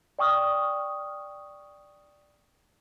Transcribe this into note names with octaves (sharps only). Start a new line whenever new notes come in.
D5 G5 C#6 D#6 F6